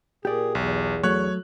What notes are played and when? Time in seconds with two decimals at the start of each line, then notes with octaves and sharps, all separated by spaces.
0.25 A#2 G4 G#4 D5
0.55 B1 E2
1.03 F#3 A3 C#5 F#6